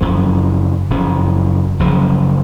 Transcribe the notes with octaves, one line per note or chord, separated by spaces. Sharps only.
F#1 F#2 C#3 F3
F#1 F#2 C#3 F3
F#1 F#2 C#3 F3